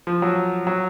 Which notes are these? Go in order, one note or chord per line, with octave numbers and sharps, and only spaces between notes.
F3
F#3
F#3